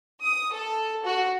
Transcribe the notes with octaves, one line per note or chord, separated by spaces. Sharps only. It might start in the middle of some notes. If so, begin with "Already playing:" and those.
D#6
A4
F#4